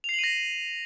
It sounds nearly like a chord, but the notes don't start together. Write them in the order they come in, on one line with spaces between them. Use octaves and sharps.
F7 C7 F#7 D#7 A#6